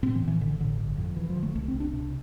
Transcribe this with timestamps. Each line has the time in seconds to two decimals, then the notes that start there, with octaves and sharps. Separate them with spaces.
0.03 A2 C4
0.15 E3
0.21 A2
0.28 E3
0.41 A1 D3
0.60 A1 D3
0.78 G1
0.97 F2
1.16 E1 E3
1.30 F3
1.36 D3
1.43 A3
1.55 C2 A3
1.68 C4
1.74 C2
1.80 D4
1.93 C3